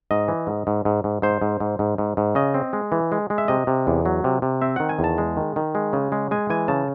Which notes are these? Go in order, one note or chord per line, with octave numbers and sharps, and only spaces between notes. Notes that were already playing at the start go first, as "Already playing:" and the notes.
G#2 D#5
E3
G#2
G#2
G#2
G#2
G#2 C5
G#2
G#2
G#2
G#2
G#2
C#3 D#5
C4
G#3
E3
G#3
G#3
E5
C3 D#5
C3
E2
F#3
C3
C3
C4 E5
D#3 F#5
G#5
E2
A5
G#3
D#3
D#3
G#3
C#3
G#3
G#3 G#5
E3 G#5
C#3 A5